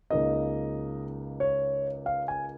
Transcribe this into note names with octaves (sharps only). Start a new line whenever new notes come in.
C#2 C#3 A#3 D#4 D#5
C#5
F5
G#5